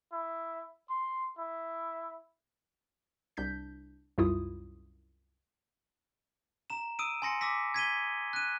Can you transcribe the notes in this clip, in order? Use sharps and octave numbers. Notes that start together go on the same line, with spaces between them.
E4
C6
E4
C2 D4 G6 B6
C2 F#2 E4 F4 D#6
A#5 E7
D#6 E6 D7 D#7
G#5 C6 A#6 C#7
D6 E6 A#6 B6
G#6 B6 D#7 G7
F#6 D#7